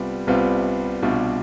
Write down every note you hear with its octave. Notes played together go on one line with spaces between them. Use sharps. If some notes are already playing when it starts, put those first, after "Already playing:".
Already playing: C2 C3 G3 B3 F4
C2 C3 G3 B3 F4
C2 B2 G3 D4 F4